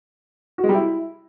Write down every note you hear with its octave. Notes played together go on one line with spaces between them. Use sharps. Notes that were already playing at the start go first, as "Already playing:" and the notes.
F#4
G#3
G3
E4